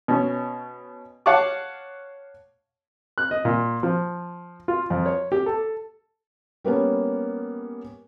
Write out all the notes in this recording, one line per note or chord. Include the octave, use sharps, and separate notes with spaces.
B2 C#4
C#5 F5 F#5 A5 C#6 D6
F#6
D#5
A#2
F3
F4
F2
C#5
G4
A4
G3 A#3 B3 C#4